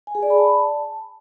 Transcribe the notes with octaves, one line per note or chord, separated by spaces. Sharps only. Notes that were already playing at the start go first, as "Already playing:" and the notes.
G#5
G#4
D5
B5
A5